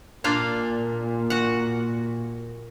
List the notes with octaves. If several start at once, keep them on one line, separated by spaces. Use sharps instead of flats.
A#2 A#3 D4 F4
F#4 F#5